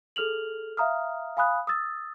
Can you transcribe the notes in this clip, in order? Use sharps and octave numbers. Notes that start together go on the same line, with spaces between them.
G#4 A4 F6 F7 F#7
E5 F5 A#5 D#6 F6
F5 G#5 B5 D#6 F#6
D#6 E6 A6